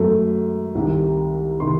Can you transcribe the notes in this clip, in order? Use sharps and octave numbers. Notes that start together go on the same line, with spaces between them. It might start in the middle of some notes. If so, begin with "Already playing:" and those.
Already playing: F#2 F#3 A3
C2 C3 D#3
C3 D#3 C6